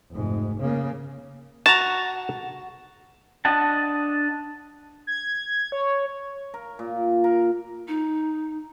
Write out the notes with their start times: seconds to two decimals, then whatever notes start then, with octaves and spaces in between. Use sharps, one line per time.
0.11 F1 G#2
0.60 C#3 A#3
1.66 F#4 A5 A#5
3.45 D4 D#5 F#5 A5
5.07 G#6
5.72 C#5
6.54 A#4
6.79 A#2
7.24 A#4
7.88 D#4